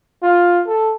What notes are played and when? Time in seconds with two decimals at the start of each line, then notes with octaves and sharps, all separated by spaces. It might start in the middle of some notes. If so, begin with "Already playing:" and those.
0.23 F4
0.67 A4